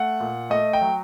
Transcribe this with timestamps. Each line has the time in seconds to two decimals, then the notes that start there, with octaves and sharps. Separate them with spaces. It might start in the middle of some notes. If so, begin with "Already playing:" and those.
Already playing: A3 F#5
0.20 A#2
0.50 A3 D#5
0.73 G5
0.81 F#3